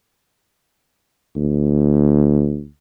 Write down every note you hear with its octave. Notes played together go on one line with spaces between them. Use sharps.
D2